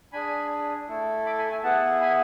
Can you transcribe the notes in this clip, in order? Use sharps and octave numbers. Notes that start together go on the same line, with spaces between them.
D4 G#4 G#5 B5
A3 E4 A4
B5 D6
G#5 B5
E5 G#5
B3 E4 G#4 F#5 A5
G#5 B5